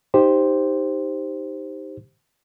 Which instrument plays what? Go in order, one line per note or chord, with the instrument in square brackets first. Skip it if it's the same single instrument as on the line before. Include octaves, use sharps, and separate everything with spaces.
[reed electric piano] D#4 G4 C5